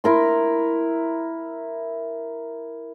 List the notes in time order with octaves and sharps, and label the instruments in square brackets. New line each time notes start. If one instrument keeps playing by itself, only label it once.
[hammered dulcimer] E4 A#4 C6